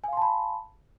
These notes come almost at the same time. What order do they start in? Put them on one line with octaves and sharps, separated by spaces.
G#5 F5 C6 A5 B5